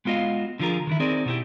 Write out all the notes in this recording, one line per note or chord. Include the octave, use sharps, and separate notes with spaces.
G#3 B3 F4 F#4 D#5 F5
D3 F3 F4 G#4 A#4
D#3 E3 E4
C4 D#4 G#4 A#4 D5
B2 E4 G4